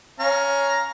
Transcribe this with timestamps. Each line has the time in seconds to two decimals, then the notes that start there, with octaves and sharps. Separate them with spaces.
0.20 C#4 F5 A#5